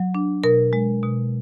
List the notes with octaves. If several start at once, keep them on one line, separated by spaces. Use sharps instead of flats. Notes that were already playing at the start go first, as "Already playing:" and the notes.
Already playing: F#3
D4
B2 A#4
G#3
B2